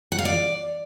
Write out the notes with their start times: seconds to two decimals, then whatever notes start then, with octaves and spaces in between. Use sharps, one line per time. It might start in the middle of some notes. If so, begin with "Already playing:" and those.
0.12 F#5
0.18 F5
0.25 D5